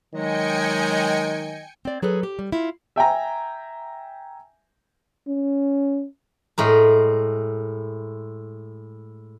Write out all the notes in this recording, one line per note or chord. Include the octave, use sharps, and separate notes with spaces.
D#3 F#3 G#3 D#5 G5 G#5 C#7
C4 D5
F#3 G#4 A4 B4
G4
G3
E4 F4
E5 G5 G#5 A#5
C#4
A2 G#3 A#4